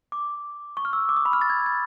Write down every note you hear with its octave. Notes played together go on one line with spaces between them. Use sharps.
D6
C#6
F6
E6
D6
D#6
B5
F6
A6
G#6
G#6